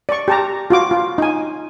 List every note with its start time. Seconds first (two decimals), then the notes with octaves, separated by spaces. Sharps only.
0.09 D5 C#6
0.28 G4 A5 A#5
0.70 F4 F#4 D6
0.91 F4
1.18 D#4 G#5